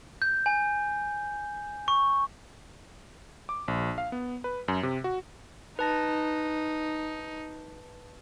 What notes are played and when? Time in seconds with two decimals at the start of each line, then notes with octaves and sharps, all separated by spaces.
0.22 G6
0.46 G#5
1.88 C#6
3.49 D6
3.68 A#1
3.98 F5
4.12 B3
4.44 B4
4.68 F#2
4.83 C3
5.04 F#4
5.79 D#4 B4 A5 A#6